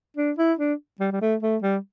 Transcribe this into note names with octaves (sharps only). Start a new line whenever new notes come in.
D4
E4
D4
G3
G3
A3
A3
G3